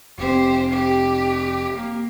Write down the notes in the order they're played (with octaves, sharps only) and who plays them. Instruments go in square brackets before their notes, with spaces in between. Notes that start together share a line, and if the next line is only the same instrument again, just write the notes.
[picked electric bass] F1 C4 [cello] G4 C5
[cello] G4
A#3